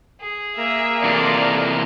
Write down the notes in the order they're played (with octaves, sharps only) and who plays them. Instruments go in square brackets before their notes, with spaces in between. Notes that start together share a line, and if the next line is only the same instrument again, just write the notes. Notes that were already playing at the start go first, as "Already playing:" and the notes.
[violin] G#4
[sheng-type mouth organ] A#3 A#4 A#5 [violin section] E5
[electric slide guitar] C3 E3 F4 [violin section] A4 D5